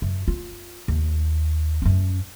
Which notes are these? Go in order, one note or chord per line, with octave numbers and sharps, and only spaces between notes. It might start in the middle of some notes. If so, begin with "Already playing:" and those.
F#2
F4
D#2
F#2 C#4